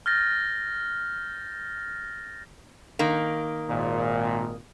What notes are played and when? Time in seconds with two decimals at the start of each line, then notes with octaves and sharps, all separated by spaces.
0.06 F6 G6 A6 A#6
2.99 D#3 A#3
3.70 G#1 A#2